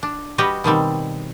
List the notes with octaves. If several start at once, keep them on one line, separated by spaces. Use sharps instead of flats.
D4
G3 F#4 G4 B4 D#5
B2 D#3 G3 C4